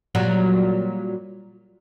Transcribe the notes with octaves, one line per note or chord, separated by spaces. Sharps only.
A#2 F#3 G3